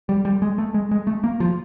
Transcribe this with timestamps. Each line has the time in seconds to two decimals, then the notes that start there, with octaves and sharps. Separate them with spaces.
0.09 G3
0.25 G3
0.42 G#3
0.58 A3
0.74 G#3
0.91 G#3
1.07 A3
1.24 A#3
1.40 F3